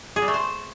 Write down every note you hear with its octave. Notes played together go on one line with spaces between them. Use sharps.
G#4
G3
A3
C5